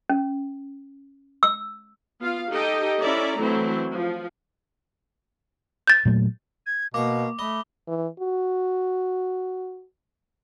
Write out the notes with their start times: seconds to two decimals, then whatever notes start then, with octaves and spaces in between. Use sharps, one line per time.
0.09 C#4
1.43 E6
2.19 B3 F4 F5
2.50 D#4 G4 A4 D#5 G5
3.00 C#4 E4 A4 D5 E5 A#5
3.40 E3 F#3 A3 C4 E4
3.91 F3
5.87 G6 A6
6.05 A#2 F#3 A3
6.66 G#6
6.94 B2 A#3 F5 C#6 D6
7.39 A3 D#5 B5 G7
7.88 E3
8.20 F#4